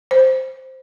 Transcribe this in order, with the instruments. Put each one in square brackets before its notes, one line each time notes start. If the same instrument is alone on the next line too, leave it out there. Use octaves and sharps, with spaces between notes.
[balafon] C5